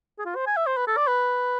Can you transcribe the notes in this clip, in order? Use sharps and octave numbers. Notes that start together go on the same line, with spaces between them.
G#4
F4
C5
G#5
E5
C5
B4
A4
D5
B4